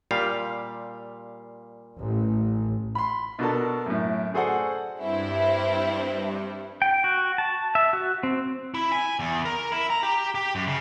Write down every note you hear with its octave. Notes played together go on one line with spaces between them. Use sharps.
A#2 G3 F5
A1
B5 C6
B2 D4 F#4 A4 A#4 A5
F#2 A2
F#4 G#4 A4 C5 D5 F#5
G2 C4 E4
G5
F#4
A5
E5
F#4
C4
E4
G#5
E2
A#4
E4
A#5
G4
G4
F#2
C#3